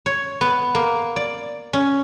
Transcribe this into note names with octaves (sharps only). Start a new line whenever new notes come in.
C#5
B3
A#3
D5
C#4